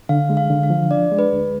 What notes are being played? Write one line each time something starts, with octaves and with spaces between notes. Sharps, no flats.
D3 F5
G#3
F5
D3
F5
F3
D4 D5
G#3
B4
D2